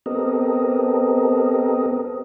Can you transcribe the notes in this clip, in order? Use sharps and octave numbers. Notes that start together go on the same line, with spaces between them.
B3 C4 G4 A4 A#4 D#5